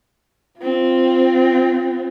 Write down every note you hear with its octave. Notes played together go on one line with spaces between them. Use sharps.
C4 F4